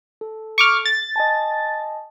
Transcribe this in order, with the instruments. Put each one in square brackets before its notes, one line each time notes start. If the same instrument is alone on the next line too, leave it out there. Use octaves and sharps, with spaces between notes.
[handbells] A4
[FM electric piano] C#6 D6 F6
A6
[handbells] D#5 G#5 A5